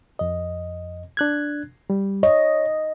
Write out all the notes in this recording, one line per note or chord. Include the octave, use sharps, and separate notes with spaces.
F2 D#5
D4 F#6 G#6
G3
C#5 D#5